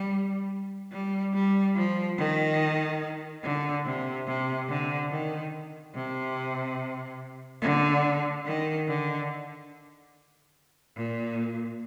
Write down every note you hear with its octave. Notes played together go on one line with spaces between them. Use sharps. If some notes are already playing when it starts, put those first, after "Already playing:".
Already playing: G3
G3
G3
F3
D#3
D3
C3
C3
D3
D#3
C3
D3
D#3
D3
A#2